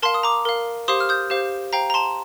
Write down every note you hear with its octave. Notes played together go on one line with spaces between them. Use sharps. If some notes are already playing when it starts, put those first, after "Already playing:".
A#4 F5 A5 C6
D#6
A#5 D6
A#4 F5
G4 C5 F5 C6 D#6
F6
D#6 G6
G4 C5 F5
C5 F5 G5 A#5
A#5
A5 C6